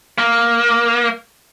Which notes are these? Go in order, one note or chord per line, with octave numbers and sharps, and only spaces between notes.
A#3